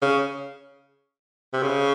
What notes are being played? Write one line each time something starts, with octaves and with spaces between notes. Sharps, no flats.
C#3
C3
C#3